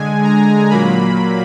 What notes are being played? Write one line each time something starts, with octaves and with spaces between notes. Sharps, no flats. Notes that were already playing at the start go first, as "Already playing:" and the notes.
Already playing: D3 G#3 G#5
A#5
A#2 F#3 A#3 B5